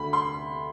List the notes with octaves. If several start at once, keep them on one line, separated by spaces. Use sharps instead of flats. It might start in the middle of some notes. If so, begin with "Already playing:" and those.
Already playing: D2 B5
C6